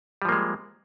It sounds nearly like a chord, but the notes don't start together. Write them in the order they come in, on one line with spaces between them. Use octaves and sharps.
G3 F3 A#3 G#3